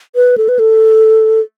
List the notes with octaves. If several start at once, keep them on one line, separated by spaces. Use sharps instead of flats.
B4
A4
B4
A4